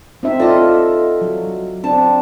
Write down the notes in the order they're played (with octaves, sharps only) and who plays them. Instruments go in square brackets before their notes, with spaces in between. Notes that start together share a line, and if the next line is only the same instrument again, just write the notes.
[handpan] C4 D#4 E5
[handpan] F4 D5 [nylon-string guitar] A4 D#5
[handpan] F#3
[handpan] C4 D4 [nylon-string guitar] A5